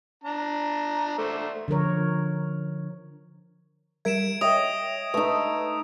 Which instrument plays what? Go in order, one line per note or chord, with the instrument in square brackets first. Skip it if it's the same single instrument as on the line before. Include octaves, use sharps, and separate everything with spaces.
[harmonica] D4 A#5
A3 C5 D5
[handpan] D3 F3 A#4 C#5
[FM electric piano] G3 A#4 E5 [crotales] G#6 D7 E7
[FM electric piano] C#5 E5 G5 [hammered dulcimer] D#5 [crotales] D#6
[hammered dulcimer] A3 D#4 [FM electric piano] B4